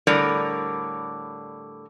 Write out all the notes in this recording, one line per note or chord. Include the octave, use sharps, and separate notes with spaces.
A2 D3 G3 A#4 D5